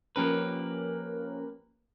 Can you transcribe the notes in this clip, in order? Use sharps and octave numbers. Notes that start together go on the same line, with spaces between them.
F3 A#3 C#4 G4 A#4 B4